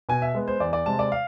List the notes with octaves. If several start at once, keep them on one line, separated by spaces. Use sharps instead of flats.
B2 G#5
E5
G#3 B3
C5
E2 D5
D5
C3 G#3 A5
D5
F5